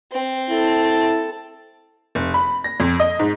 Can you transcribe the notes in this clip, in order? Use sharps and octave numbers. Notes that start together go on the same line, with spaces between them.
C4
E4 A4 A5
F1
B5
A#6
F2
D#5
G#2